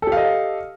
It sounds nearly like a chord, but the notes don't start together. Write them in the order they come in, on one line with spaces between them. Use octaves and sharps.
A4 G4 F5 D#5